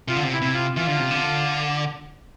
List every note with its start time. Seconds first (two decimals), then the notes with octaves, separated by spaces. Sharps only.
0.08 C3 F4
0.16 D3
0.25 C3
0.32 E4
0.42 C3
0.54 F4
0.77 E3 F4
0.88 D3
1.00 C3
1.11 D3